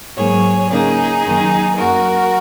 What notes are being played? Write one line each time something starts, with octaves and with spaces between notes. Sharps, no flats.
G#2 F#3 A#3 G#4 C#5
C#3 A#3 D#4 G#4
F#2 D#3 A#3
F#2 F#3 A#3 F#4 A#4